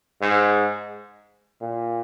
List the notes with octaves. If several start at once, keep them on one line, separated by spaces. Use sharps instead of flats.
G#2
A#2